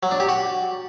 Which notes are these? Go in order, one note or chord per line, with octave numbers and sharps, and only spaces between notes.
F#3
D4
G4
F#4